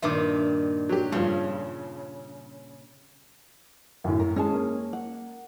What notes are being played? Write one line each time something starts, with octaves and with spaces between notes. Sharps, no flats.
G2 A#2 D#3 E5 D6
F#3 G4
G2 C#3 F3
F#2 A2
A#4
G#3 C#4 G#4 A5
A#3
F#5